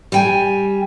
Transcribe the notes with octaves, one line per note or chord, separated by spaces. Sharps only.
G3 G5 G#5